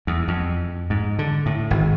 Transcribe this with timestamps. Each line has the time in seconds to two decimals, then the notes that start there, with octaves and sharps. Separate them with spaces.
0.07 E2
0.28 F2
0.90 G#2
1.19 D3
1.46 A2
1.70 G#1